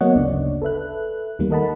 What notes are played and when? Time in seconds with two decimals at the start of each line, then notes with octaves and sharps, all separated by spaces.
0.01 F#3 A#3 B3 C#5 D#5 F#5
0.15 G1 D2 C#3 D4 D5
0.62 A4 B4 E5 F#6
1.39 D#2 D#3 G3 A#3
1.50 A4 A#4 D#5 F#5 A5 B5